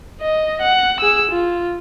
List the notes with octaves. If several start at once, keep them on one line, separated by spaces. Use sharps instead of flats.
D#5
F#5
G#4 E6
F4